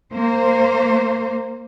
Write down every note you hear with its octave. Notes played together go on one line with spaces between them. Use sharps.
A#3 C5